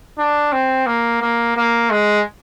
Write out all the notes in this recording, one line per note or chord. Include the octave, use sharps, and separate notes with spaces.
D4
C4
A#3
A#3
A#3
G#3